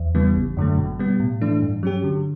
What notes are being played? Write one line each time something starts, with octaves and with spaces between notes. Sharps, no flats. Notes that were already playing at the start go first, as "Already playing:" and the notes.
Already playing: E2
C#3 E3 G3 B3
G1
F#2 D3 F#3 A3
B2
G3 B3
A2
E3 A3 D4
G2
F#3 C#4 G4
D3